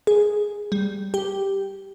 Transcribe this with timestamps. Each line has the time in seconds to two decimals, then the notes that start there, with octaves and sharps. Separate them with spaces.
0.07 G#4
0.72 G3
1.14 G4